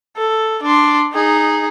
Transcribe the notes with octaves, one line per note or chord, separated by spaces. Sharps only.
A4
D4 C6
D#4 G#4